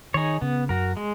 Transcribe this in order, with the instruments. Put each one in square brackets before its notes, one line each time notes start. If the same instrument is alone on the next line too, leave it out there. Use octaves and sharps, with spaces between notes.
[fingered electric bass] D#3 [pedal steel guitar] D#4 G#4 C#5
[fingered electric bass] C#3 [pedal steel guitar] B3
[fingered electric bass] F#2 [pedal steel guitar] F#4 A#4
[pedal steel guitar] G#3